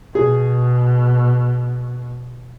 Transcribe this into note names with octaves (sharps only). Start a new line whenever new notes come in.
B2 G#4